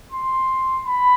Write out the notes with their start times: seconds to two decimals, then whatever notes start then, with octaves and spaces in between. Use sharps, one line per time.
0.12 C6
0.86 B5